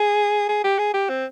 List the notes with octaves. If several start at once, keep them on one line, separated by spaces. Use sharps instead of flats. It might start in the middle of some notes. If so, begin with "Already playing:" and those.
Already playing: G#4
G#4
G4
G#4
G4
C4